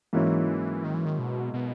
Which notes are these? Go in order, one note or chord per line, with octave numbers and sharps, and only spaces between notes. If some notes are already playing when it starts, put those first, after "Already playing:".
G#2 E3 F#3 A#3 C#4 E4
D#3
E3
D#3
B2
B2